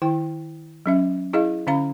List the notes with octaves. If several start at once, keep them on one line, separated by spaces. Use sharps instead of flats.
D#3 E4 G5
F#3 C#4 E5
E4 G#4 D#5 F5
D3 C#4 F5 A#5